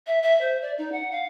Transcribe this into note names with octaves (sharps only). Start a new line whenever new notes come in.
E5
E5
C5
D5
D#4
F#5
F5